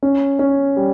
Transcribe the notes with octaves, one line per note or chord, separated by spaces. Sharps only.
C#4
C#4
G3